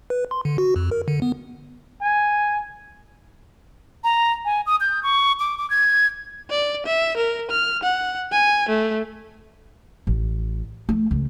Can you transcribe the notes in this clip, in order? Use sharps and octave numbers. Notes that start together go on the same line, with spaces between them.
B4
C6
D3
F#4
F2
A#4
D3
B3
G#5
A#5
G#5
D#6
G6
C#6
D6
D6
G#6
D5
E5
A#4
F6
F#5
G#5
A3
A1
A3
C#2